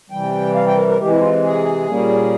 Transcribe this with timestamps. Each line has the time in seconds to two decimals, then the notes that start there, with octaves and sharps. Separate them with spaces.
0.10 C3 E3 G3 G5
0.55 F5
0.66 G5
0.77 A#4
0.88 A#4
0.99 C3 E3 G#3 G4
1.10 E4
1.20 F4
1.43 G#4
1.88 A#2 G3 A#3 C#4